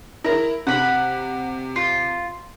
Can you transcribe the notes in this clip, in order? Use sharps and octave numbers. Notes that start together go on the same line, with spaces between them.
E4 A#4 A#5
C3 F#5 B5
F4